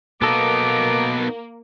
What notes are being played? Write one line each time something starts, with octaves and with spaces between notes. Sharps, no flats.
B2 A#3 B3 D#4 A4 D6